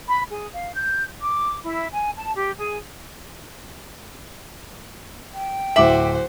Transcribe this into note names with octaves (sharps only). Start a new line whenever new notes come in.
B5
G#4
F5
G6
D6
E4
G#5
A5
G4
G#4
G5
D1 F#4 C5 E5 D6 F#7